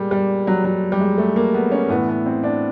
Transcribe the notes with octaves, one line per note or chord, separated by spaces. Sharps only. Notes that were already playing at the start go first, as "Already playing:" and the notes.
Already playing: A#2 G3 G#3
G3
F#3
F#3
G3
G#3
A3
A#3
B3
C#4
A2 E3 B3
B3
C4
D4